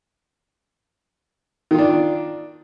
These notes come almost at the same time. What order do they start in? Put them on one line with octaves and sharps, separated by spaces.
D#3 F4 D4